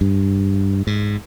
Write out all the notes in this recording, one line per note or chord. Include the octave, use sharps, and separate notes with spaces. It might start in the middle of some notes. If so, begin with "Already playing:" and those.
G2
G#2